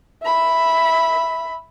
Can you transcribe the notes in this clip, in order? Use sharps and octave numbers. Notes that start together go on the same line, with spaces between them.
E5 B5